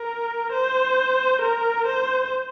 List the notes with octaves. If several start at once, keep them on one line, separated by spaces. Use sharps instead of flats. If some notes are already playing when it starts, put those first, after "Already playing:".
Already playing: A#4
C5
A#4
C5